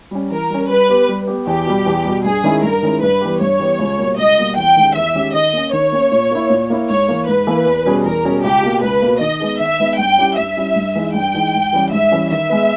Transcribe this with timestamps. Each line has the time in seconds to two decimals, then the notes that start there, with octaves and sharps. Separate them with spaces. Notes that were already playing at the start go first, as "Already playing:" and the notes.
0.11 G3 C#4
0.31 E3 A#4
0.50 G3 C#4
0.69 G3 B4
0.89 B3 G4
1.09 G3
1.27 B3 G4
1.47 E2 G4
1.66 B2 G3
1.86 E2
2.05 B2 G3
2.24 G2 G#4
2.44 D#3 G#3 C#4 E4
2.63 G2 A#4
2.83 D#3 G#3 C#4 E4
3.02 G2 B4
3.21 E3 G3 B3 G4
3.41 G2 C#5
3.60 E3 G3 B3 G4
3.79 C#2
3.98 B2 G3 A#3
4.18 C#2 D#5
4.37 B2 G3 A#3
4.56 E2 G5
4.77 D#3 G#3 C#4 G4
4.95 E2 E5
5.15 D#3 G#3 C#4 G4
5.34 D#3 D#5
5.53 A#3 C#4
5.72 D#3 C#5
5.92 A#3 C#4
6.12 A#2
6.31 A#3 E4
6.50 A#2
6.70 A#3 E4
6.89 G#2 C#5
7.08 E3 A#3
7.27 G#2 B4
7.47 E3 A#3
7.66 E2
7.85 B2 G3 C#4 G#4
8.04 E2 A#4
8.24 B2 G3 C#4 G#4
8.44 C#2 G4
8.63 B2 A#3
8.82 C#2 B4
9.02 B2 A#3
9.21 D#3 D#5
9.40 G#3 B3 D#4 G#4
9.60 D#3 E5
9.80 G#3 B3 D#4 G#4
9.99 G2 G5
10.18 G3 C#4 E4 G4
10.37 G2 E5
10.57 G3 C#4 E4 G4
10.76 G2
10.95 E3 G#3 D#4
11.15 G2 G5
11.34 E3 G#3 D#4
11.54 G#2
11.73 E3 G3 C#4
11.92 G#2 E5
12.11 E3 G3 C#4
12.30 D#3 E5
12.50 G#3 B3